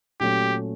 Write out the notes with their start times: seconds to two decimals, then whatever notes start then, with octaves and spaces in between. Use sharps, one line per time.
0.20 A#2 F#3 A3 C#4 G4